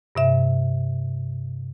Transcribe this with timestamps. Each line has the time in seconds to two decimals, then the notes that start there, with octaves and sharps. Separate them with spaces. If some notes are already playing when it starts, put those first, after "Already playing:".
0.15 G2 C3 E5